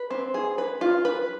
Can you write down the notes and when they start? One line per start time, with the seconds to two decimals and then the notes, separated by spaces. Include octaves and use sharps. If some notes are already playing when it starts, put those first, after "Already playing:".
Already playing: B4
0.10 C4
0.34 G#4
0.58 B4
0.81 F4
1.05 B4